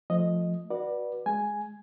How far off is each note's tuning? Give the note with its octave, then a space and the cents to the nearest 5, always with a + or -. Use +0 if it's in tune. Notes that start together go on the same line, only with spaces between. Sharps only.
F3 +0 A3 +0 D#5 +0
F#4 +0 B4 -20 D5 +15
G#3 +0 G#5 +0